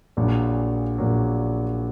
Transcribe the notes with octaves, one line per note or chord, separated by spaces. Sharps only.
A#1 A#2 F#3
A#1 A#2 F#3